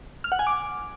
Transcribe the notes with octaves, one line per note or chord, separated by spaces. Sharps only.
F6
F#5
G#5
D6